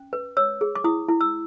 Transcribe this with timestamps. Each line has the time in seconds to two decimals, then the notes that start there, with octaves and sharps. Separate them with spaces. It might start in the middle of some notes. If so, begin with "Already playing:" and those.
Already playing: C#4
0.13 B4
0.37 C#5 E6
0.61 G#4
0.75 D6
0.84 E4 D#6
1.09 E4
1.21 E6